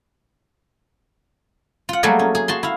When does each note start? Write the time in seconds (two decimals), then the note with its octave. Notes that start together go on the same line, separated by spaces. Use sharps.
1.89 F4 F#5
2.03 F#3 G3 A3 A#3 G#4 A4
2.19 C#4
2.35 G#4
2.48 F#4 A5 C6
2.63 E4 F5